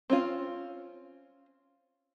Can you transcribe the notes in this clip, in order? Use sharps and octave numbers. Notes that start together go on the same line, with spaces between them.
C4 C#4 F4